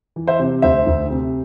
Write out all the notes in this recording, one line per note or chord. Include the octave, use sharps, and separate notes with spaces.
E3
C5 E5
C3
D2 C5 E5
D2
C3